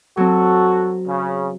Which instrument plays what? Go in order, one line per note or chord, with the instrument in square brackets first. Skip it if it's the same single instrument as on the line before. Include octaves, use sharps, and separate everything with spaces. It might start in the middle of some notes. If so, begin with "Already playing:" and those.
[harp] F#3 C4 [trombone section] F#4 A4
[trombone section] C#3